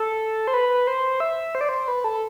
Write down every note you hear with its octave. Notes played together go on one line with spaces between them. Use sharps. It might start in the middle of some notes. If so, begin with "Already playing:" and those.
Already playing: A4
C5
B4
C5
E5
C5
D5
C5
B4
A4